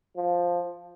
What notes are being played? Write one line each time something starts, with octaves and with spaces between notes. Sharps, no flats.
F3